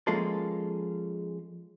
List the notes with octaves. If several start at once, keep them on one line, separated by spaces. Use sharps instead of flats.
F3 G#3 A#3 C#4 A4